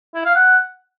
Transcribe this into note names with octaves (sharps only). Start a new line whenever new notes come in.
E4
F5
F#5